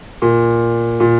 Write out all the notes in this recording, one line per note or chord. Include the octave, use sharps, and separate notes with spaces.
A#2
A#2